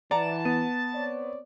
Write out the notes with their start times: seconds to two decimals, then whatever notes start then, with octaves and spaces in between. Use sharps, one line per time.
0.11 E3 D5 F#5 A5 A#5
0.45 B3 D#7
0.94 C4 C#5 D5